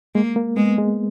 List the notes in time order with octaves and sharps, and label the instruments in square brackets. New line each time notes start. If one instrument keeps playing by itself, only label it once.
[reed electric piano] G#3 [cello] A#3
[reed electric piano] A#3
[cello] G#3 [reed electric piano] B3
[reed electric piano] G#3